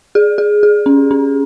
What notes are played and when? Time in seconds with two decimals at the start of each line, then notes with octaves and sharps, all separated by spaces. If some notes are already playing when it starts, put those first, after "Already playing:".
0.15 G#4
0.38 G#4
0.63 G#4
0.86 C#4
1.11 C#4